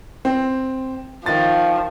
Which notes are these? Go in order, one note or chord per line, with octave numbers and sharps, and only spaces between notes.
C4
D#3 F3 A6